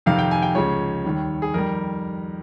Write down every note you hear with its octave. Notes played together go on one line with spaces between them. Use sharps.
F2 C3 D#3 F5
G5
G#5
G5
C#2 C#3 F3 C#5
D#2 D#3 G3
G#4
F2 D#3 G3 A#4